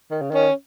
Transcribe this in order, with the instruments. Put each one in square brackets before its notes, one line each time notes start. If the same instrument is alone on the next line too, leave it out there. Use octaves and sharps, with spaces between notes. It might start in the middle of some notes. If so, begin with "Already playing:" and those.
[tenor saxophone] D#3
C#3
[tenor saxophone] D#3 [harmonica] C#4